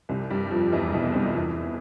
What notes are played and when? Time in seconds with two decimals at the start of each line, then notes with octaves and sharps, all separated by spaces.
0.09 C2 C3
0.30 G2 G3
0.51 F2 F3
0.72 E2 E3
0.93 B1 B2
1.14 C2 C3
1.35 E2 E3